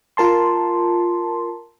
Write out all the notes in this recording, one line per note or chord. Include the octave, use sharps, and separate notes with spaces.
F4 A#4 A5 C6